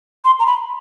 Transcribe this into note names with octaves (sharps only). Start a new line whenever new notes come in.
C6
A#5
B5